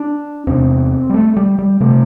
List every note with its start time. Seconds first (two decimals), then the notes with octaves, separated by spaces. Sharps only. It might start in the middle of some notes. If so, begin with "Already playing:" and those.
Already playing: D4
0.47 E2 C3 C4
1.09 G3
1.14 A3
1.36 G3
1.59 G3
1.80 C3 A3